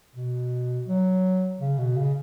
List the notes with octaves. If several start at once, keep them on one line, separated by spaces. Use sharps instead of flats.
B2
F#3
C#3
B2
C#3